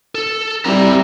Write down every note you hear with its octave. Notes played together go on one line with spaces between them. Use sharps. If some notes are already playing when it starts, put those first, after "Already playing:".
A4
G3 C4 E4 A#5